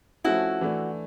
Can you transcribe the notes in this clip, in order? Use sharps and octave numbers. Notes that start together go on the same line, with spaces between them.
F3 A3 C#4 E4 F#4
E3 A3 D4